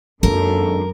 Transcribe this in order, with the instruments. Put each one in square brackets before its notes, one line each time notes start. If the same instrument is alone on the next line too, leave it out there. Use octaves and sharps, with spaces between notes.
[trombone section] G#1 A4 [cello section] F#2 [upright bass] A#3 D4 [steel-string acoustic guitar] A#4